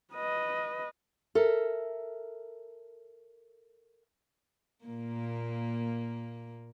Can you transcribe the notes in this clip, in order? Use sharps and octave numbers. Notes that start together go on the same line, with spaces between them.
B4 D#5
A4 A#4 E5
A#2 A#3